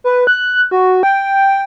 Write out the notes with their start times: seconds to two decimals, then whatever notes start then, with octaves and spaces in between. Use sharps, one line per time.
0.04 B4
0.27 F#6
0.71 F#4
1.03 G5